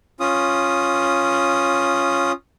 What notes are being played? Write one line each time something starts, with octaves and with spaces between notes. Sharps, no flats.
C#4 F4 D#6